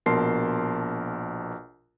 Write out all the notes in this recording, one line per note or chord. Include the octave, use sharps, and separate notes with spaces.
A#1 B2 A#4 A5 C6 C7